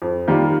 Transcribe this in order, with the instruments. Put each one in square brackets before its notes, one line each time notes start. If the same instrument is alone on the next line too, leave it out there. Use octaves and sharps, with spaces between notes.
[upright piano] F2
D#3 G3 A#3 F4